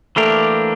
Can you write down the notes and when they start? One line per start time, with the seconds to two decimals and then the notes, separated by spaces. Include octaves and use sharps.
0.16 E3 A3 A#3 D4 G4 A#4